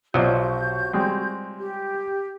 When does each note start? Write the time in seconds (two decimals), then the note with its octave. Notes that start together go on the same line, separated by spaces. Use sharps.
0.14 B1 C3 F3 F#3 F#4 D5 D#5 G6
0.93 G3 G#3 C4
1.58 G4